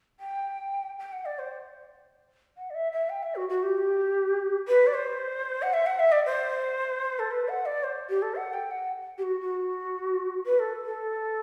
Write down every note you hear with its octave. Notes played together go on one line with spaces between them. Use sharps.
G5
G5
F#5
D5
C5
F#5
D5
E5
E5
G5
E5
F#4
F#4
G4
B4
D5
C5
F#5
E5
F#5
E5
D5
C5
A4
B4
F#5
D5
C5
G4
A4
F#5
G5
F#5
G4
F#4
F#4
B4
A4
A4